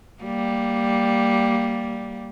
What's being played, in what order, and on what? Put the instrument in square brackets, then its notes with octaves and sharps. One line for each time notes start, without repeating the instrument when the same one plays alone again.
[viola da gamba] G3 A#3